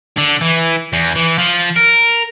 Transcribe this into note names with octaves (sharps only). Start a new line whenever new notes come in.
D3
E3
E2
E3
F3
A#4